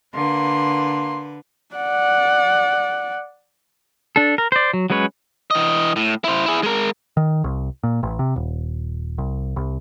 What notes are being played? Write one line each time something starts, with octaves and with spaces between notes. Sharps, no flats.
D3 A#3 B4 C6
D5 F#5
D4 A4
A#4
C5 D5
F#3
F#3 G#3 C#4 B4 C#5
E3 D#5
A2
E4 C5
E4 G#4
G#3 A#4
D#3
C2
A#2
A1
C3
D#1
C2
C2